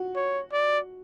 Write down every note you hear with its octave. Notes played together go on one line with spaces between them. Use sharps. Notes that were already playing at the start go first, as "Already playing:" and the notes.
Already playing: F#4
C#5
D5